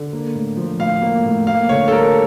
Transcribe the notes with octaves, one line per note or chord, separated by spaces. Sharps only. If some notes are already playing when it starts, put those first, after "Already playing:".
Already playing: D3
A#3
A2
F3
A2 F5
A#3
A2
A#3 F5
D3 C#5
A4
G3 A#4